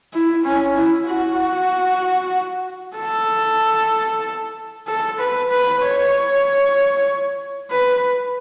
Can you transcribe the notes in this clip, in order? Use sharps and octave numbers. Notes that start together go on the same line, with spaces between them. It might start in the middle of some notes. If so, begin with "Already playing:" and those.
E4
C#4
E4
F#4
A4
A4
B4
B4
C#5
B4